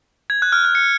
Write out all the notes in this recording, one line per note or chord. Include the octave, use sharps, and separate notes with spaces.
G#6
F#6
F6
F#6
C#7